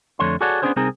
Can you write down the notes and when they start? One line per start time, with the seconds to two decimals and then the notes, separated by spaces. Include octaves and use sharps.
0.19 F2 D3 A3 D4 C#5 C6
0.41 F#4 G#4 A4 C#5 D5 F#5
0.62 B3 C#4 D4 G#4 C5 C#5
0.76 C2 C4 D#4 G#4 A#4